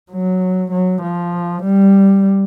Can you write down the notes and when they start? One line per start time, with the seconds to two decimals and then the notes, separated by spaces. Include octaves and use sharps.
0.11 F#3
0.72 F#3
1.03 F3
1.64 G3